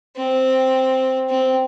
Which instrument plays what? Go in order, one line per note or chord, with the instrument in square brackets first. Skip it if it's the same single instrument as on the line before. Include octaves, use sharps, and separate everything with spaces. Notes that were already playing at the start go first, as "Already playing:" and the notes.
[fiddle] C4
C4